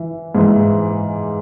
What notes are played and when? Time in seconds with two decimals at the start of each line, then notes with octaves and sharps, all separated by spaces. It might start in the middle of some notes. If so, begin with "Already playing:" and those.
Already playing: E3
0.35 G#2 E3